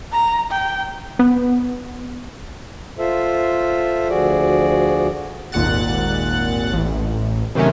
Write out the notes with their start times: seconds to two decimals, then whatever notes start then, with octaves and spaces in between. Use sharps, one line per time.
0.12 A#5
0.51 G5
1.19 B3
2.98 F4 A4 C5 E5
4.09 D2 F3 F#4 G#4 D5
5.52 G#1 D#2 A#2 F#5 F#6 A6
6.73 A1
7.55 C3 D#3 F#3 A3 C#4